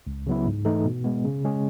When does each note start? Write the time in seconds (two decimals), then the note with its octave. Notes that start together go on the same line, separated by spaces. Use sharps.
0.07 C#2
0.27 C#3 F#3 B3 E4
0.47 G#2
0.65 E3 A3 D#4 A4
0.85 B2
1.04 G#3 B3
1.25 C#3
1.44 G#3 C#4 G#4